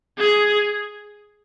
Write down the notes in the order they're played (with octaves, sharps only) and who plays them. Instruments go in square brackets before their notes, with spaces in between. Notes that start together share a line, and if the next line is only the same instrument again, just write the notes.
[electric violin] G#4